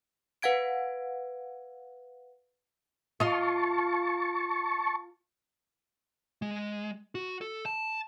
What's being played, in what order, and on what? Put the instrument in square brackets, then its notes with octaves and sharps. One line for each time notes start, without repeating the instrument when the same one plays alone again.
[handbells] B4 F5 F#5 G#6 D7
[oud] F4 D#5 [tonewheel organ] A5 C#6
[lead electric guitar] G#3
F#4
A4
A5